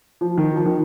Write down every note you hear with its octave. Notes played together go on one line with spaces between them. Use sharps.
F3
D#3
F3
D#3